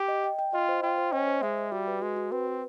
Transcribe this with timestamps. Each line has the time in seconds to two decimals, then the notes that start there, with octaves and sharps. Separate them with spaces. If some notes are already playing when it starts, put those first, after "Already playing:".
Already playing: G4
0.08 D#5
0.24 G5
0.39 G5
0.53 F4 D#5
0.69 C5
0.82 F4 G5
0.98 C5
1.12 C#4 D#5
1.28 C5
1.42 G#3 E5
1.58 E5
1.72 G3 F#4
1.87 B4
2.02 G#3 F#4
2.16 F#4
2.32 C4 B4
2.47 B4